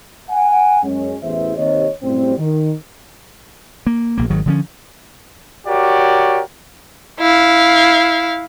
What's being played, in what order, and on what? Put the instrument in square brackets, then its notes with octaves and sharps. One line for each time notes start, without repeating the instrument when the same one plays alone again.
[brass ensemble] F#5 G#5
F#2 G#3 C#4
A1 E2 E3 G#4 C5 E5
D#2 C3 C#5 D#5
F#2 A2 C3 G3 C4
D#3
[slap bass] A#3
A#1 A#3
G#1 D#3 F#3
D3 F3 C#4
[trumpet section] F#4 G4 A#4 C#5 D5
[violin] E4 F5